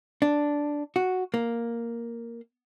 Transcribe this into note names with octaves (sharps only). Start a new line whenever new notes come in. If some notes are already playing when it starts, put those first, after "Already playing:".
D4
F#4
A#3